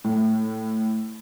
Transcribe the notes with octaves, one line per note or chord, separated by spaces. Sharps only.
A2